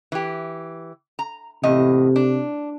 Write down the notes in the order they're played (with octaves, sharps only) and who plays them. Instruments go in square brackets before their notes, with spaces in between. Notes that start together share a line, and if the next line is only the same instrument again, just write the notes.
[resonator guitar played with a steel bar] E3 G4
A#5
[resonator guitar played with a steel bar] E2 A2 D#5 [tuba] C3
[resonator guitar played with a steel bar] D4